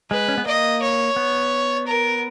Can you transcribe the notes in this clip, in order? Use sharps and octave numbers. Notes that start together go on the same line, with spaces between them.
G#3 B4
C#4
B3
A#3 D#5
C#5
B3
A#4